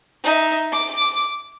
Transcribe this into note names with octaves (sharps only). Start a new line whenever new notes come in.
D#4 E5
D6